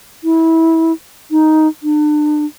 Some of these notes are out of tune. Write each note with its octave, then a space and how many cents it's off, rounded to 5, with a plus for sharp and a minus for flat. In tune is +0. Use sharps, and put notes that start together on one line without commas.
E4 -20
D#4 +5
D4 +35